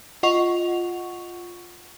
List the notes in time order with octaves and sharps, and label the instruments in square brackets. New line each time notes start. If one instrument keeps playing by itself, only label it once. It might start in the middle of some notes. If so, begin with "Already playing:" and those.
[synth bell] F4 D#5 F#5 C#6 F7